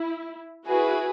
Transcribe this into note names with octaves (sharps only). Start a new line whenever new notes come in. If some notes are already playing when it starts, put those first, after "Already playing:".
Already playing: E4
E4 F#4 G#4 B4